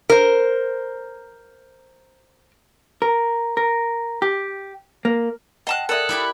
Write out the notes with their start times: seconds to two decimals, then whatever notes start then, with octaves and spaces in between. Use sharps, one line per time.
0.10 A#4 C5
3.02 A#4
3.57 A#4
4.22 G4
5.05 A#3
5.67 D#5 F#5 G5 A5 F#6
5.89 A4 A#4 D5 E5 D#6 F#6
6.09 E4 G4 B5